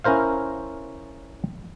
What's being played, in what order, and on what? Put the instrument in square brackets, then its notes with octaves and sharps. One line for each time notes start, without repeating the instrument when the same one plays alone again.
[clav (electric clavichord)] C#4 E4 A#4 C5 F5